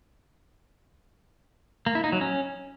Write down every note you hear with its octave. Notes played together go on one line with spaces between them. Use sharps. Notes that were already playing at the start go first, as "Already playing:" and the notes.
A#3
E4
D#4
F#3
C#4